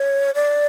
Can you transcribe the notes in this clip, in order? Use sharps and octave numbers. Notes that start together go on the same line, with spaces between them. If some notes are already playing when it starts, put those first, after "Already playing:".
Already playing: C#5
D5